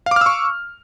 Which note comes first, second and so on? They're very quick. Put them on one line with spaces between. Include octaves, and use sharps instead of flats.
F5 D6 F6 E6 C#6